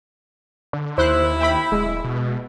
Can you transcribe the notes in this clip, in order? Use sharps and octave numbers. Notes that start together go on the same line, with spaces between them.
D3
D#2 E4 C5 F#6
E5 G5 B5
D1 G#3
B2